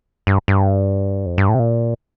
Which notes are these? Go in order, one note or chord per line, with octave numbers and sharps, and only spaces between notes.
G2
G2
F2
G2
A2
C3
A#2